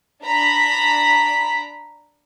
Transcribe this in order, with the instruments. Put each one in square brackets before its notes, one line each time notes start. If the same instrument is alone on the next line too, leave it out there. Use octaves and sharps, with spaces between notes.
[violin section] D4 A#5 B5 B6